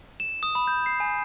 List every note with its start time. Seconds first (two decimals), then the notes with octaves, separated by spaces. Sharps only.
0.20 E7
0.43 D#6
0.55 B5
0.67 G6
0.86 C7
1.00 G#5